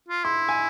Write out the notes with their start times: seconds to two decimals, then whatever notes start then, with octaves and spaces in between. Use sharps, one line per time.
0.09 F4
0.24 E4 C6
0.49 G#5